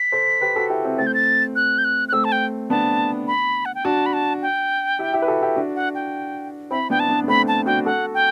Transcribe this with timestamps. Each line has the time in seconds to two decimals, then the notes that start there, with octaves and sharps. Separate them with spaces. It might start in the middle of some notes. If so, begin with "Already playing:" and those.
Already playing: B6
0.12 A4 C5
0.41 G4 B4
0.56 F#4 A4
0.69 E4 G4
0.85 C4 E4
0.98 A3 C4 A6
1.07 G6
1.14 A6
1.56 F#6
1.78 G6
1.84 F#6
2.09 F#6
2.12 A3 C4 E6
2.24 A5
2.32 G5
2.70 B3 D4 A5
3.27 B5
3.65 F#5
3.75 G5
3.85 D4 F#4 A5
4.06 B5
4.13 A5
4.42 G5
4.99 E4 G4
5.13 E4 G4
5.22 B4
5.28 F#4 A4
5.42 E4 G4
5.56 D4 F#4
5.76 F#5
5.95 G5
6.71 C4 E4 B5
6.90 B3 D4 G5
7.00 A5
7.09 B3 D4
7.24 B3
7.28 A3 C4 B5
7.48 A5
7.66 D4 F#4 G5
7.85 F#4 A4 F#5
8.14 G5